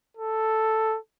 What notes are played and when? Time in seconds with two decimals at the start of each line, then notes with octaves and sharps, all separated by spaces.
0.17 A4